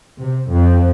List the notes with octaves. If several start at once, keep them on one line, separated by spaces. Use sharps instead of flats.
C3
F2